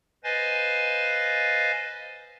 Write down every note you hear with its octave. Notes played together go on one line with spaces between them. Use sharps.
B4 C5 D#5 F5 G#5 A6